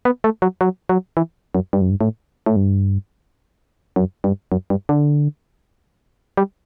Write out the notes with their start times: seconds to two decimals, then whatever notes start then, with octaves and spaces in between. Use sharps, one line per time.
0.05 B3
0.24 A3
0.42 F#3
0.61 F#3
0.89 F#3
1.17 E3
1.55 F#2
1.73 G2
1.81 F#2
1.91 G2
2.01 A2
2.46 A2
2.56 G2
3.96 F#2
4.24 G2
4.52 F#2
4.70 G2
4.89 D3
6.37 G3